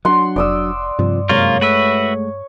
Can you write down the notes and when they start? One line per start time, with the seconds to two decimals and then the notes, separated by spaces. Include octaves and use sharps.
0.05 F#3 D4 F#5 C6
0.36 F1 D5 D#6 E6
0.99 G2 C3 F3
1.29 F#2 C3 G#3 A#3 F4 C#5
1.61 G#3 A3 F#4 B4 E5